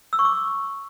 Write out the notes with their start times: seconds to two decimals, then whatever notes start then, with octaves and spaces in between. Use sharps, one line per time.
0.13 E6
0.19 C#6
0.25 D6